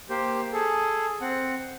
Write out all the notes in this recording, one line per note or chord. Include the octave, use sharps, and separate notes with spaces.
A#3 G4 C5
G#4 A4
C4 F#5